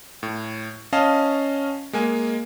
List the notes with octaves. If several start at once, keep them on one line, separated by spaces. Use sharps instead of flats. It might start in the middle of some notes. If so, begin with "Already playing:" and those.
A2
C#4 D#5 F5 A5
G#3 A#3 G#5